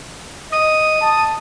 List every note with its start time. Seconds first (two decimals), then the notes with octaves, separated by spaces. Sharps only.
0.52 D#5 D#6
1.01 A5